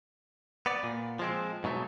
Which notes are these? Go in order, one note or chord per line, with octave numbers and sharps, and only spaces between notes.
B3 D5
A#2
F3 G#3 C4
G#2 B2 F#3 A3